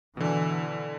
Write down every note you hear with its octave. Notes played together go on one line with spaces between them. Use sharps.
B2 D3 E3